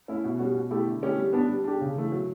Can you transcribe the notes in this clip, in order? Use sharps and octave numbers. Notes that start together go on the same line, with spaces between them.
A3 C#4 E4
B2
G3 C#4 F#4
B2
A3 E4 G4
D3
A3 C#4 E4 G4
G3
B3 D4
G3
D4 G4
C#3
E3 A3
F#3